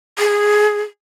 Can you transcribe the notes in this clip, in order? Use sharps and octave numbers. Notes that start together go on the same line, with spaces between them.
G#4